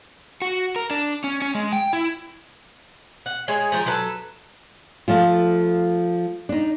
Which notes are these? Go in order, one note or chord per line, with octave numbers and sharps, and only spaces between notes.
F#4
A#4
D4
C#4
C#4
G#3
G5
E4
F#5
G#3 G#4 C#5
F3 G5 A#5
F#3 A4 B4
F3 A3 F4
D4 D#4